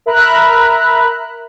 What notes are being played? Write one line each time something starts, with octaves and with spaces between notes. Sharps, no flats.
A#4 E5 A#5 B5 F#6